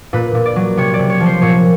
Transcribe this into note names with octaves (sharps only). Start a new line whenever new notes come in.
A#2 B4
A#2
D5
F#3
C3 C#5
D5
C3
C#5
F3
C5
A#2 C#5